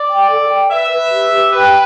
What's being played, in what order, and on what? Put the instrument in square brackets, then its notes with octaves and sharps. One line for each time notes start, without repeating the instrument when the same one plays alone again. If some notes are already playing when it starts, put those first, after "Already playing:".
Already playing: [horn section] D5
[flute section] G5
A4
G5
[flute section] B4 [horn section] E5
[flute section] B4
G4
G4
[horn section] B4 [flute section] G5